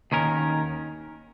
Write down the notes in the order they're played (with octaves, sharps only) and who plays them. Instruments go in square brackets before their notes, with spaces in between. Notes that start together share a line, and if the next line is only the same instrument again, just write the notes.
[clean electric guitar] D#2 D#3 C#4 A#4